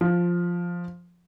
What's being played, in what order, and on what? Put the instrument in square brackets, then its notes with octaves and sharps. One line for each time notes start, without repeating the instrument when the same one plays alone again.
[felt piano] F3